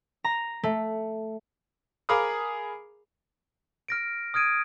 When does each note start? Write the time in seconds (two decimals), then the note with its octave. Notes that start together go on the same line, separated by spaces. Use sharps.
0.24 A#5
0.63 A3
2.09 G#4 A#4 F5 B5 D6 D#6
3.88 F6 A#6 D7
4.34 D#6 F6 G#6 D7 D#7